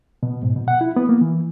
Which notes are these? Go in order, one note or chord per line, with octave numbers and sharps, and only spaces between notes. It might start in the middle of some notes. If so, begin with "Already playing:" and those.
B2
G#2
B2
F#5
E4
B3
A#3
E3